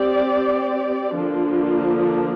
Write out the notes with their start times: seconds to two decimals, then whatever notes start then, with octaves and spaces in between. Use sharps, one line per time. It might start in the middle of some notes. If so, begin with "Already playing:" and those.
Already playing: C4 G4 D5
1.14 D3 F3 A#3 D4